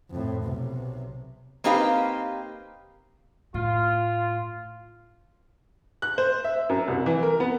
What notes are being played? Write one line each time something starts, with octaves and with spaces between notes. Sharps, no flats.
F2 A2
B1 C3
A#3 C4 D#4 G4 B4 F5
A2 F4
F#6
C5
E5
F#2
C2
E3
A#4
B3